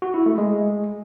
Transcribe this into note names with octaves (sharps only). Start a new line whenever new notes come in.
F#4
E4
A3
G#3